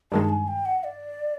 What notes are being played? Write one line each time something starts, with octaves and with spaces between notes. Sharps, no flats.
G2 D#3 G#3 A5
G#5
G5
F#5
D5